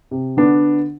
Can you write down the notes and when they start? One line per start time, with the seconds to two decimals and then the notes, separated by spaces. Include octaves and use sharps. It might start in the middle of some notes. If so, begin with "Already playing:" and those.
0.11 C3
0.37 D3 B3 D4